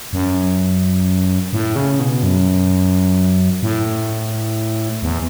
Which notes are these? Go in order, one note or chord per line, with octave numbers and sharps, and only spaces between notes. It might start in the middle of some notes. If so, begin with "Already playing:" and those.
F#2
A2
C#3
B2
F#2
A2
E2